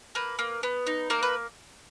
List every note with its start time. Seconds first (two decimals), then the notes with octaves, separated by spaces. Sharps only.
0.15 A#3 B4
0.39 A#3
0.63 B3
0.87 D#4
1.10 A#3 A#4
1.23 B4